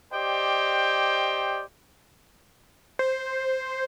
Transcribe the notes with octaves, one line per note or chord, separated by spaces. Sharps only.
G4 C5 D5 D#5 G5
C5